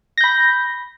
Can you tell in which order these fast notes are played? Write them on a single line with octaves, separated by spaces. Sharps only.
A#6 G6 B5